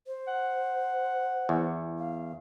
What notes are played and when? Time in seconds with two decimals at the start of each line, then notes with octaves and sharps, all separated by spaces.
0.07 C5
0.27 F#5
1.49 E2
1.99 F5